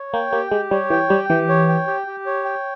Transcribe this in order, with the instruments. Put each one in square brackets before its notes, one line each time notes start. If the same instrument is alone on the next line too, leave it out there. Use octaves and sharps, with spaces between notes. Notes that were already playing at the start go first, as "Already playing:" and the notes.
Already playing: [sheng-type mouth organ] C#5
[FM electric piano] A#3 [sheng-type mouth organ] G5
[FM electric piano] A#3 [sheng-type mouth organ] G4
[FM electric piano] G#3 [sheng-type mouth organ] G4
[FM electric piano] G3 [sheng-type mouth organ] C#5
[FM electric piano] E3 [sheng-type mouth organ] G5
[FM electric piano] G3 [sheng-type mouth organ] G4
[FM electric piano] E3 [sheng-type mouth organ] G4
[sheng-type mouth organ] C#5
G5
G4
G4
C#5
G5